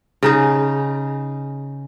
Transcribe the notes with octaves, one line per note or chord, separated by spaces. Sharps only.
C#3 D#4 G#4